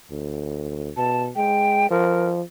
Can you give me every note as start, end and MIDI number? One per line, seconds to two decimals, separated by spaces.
0.11 0.91 38
0.97 1.31 47
0.97 1.21 81
1.36 1.88 56
1.36 1.89 79
1.91 2.42 53
1.91 2.30 70